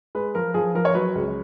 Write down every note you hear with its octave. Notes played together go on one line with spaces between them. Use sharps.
G#3 B4
F3 A#4
F3 G#4
F3 A#4
C#5
F#3 B4
C#2